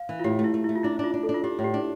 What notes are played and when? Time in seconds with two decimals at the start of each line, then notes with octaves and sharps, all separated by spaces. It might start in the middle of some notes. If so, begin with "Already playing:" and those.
Already playing: F5
0.09 E3
0.19 F4
0.24 A2 G4
0.39 A3
0.44 E4
0.54 A3
0.64 A3 E4
0.75 F4
0.83 D4 E4
0.99 D4 F4
1.14 D4
1.23 A4
1.29 D4
1.34 F4
1.44 D4 G4
1.59 A2
1.64 G4
1.74 D4